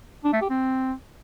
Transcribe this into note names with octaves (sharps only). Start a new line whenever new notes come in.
D4
A3
G4
C4